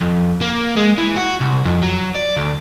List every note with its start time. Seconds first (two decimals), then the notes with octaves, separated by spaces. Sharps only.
0.01 F2
0.41 A#3
0.76 G#3
0.98 E3
1.16 F#4
1.40 C2
1.65 F2
1.83 F#3
2.15 D5
2.37 D2